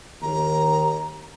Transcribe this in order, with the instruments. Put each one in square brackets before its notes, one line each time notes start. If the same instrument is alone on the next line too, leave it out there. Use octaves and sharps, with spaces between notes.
[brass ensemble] D#2 D#3 [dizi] A#5